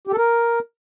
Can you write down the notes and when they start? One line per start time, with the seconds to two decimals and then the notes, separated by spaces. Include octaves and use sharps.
0.07 G4
0.12 A4
0.18 A#4